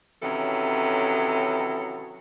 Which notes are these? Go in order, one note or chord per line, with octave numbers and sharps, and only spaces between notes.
C3 D#3 E3 F#3 C#4 A4